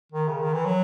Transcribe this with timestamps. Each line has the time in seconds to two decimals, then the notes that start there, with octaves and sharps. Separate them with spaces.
0.12 D#3
0.28 C#3
0.40 D#3
0.53 E3
0.65 F#3